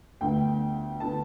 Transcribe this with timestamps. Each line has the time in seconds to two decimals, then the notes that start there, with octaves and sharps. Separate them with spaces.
0.21 D2 D3 B3 G5
1.00 D3 B3 A5